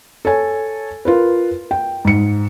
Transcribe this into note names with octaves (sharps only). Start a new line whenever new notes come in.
A4 C#5 G#5
F4 A#4 B4
G5
G#2 C#7